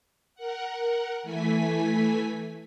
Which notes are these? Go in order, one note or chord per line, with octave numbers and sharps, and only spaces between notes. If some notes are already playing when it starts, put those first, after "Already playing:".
A#4 F#5
E3 A3 G#5 B6